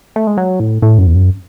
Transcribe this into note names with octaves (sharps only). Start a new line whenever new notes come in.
A3
G#3
F#3
A2
A2
F#2
E2
F#2